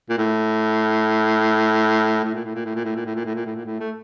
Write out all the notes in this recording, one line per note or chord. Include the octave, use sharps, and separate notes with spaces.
A#2
A2
A2
A#2
A2
A#2
A2
A#2
A2
A#2
A2
A#2
A2
A#2
A2
A#2
A2
A3